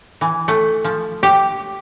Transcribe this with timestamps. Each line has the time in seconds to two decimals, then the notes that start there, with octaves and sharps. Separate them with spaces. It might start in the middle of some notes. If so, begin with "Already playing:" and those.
0.21 E3
0.48 A3
0.85 F3
1.23 G4